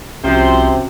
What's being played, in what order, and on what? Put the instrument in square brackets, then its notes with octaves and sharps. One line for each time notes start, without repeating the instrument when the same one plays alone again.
[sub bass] C2 [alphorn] C3 [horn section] F3 C5 [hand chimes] C#4 F#4